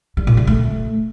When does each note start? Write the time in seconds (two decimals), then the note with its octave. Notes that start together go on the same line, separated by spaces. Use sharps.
0.17 G3
0.27 A#2
0.37 C#3
0.47 A3